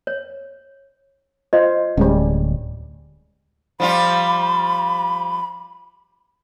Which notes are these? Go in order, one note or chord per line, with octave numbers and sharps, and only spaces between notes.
C#5
F4 C5 D#5
D1 G3 G#3 C#4
F3 G3 F4 B5